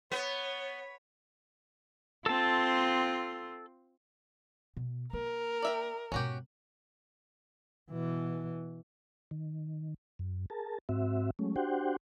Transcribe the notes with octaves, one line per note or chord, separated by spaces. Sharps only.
B3 C#5
C4 F4 A4 A5
B2
A#3 A#4
D5 E5 G5
G#2 B2 C#4 F#4 G4
B2 E3
D#3
F#2
G#4 A#4 A5
G#2 C4 F#4 E5
F#3 G#3 A3 C#4
D4 F#4 G4 C5 F#5 G5